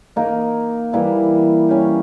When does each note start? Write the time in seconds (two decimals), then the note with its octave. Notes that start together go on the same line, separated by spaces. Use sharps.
0.16 A#3 D#4 A#4
0.93 E3 G3 A#3 E4
1.69 G3 C#4 G4